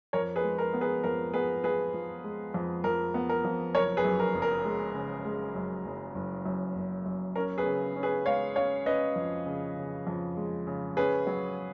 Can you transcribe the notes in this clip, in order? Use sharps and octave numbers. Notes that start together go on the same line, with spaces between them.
F2 A#4 C#5
G#4 B4
G#3
A#4
B3
G#4 B4
F2 A#4
B3 G#4 B4
F3 G#4 B4
F3
G#3
F2
F2 A#4
B3
A#4
F2
F#1 A#4 C#5
G#4 B4
F#2
A#4
F#1
A#4
G#3
C#3
G#3
F#2
F#1
F#1
F#2
F#1
F#2
C#4 A#4
G#4 B4
C#3
C#4
G#4 B4
G#3 C#5 F5
C#4 C#5 F5
C#4 B4 D#5
F2
C#3
C#3
F2
G#3
C#3
C#4 G#4 B4
F#3